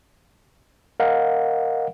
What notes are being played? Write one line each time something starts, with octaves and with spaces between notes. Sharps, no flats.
A#4 D#5 F5 F#5